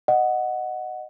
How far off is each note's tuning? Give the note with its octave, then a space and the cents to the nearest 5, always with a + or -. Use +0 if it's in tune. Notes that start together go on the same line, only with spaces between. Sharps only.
D#5 -10 F#5 +0